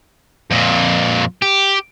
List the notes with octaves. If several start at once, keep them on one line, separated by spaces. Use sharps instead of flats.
F2 A#2
G4